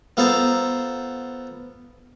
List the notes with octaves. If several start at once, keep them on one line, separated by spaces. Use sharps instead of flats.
B3 F4 A4 C5 A5 A#5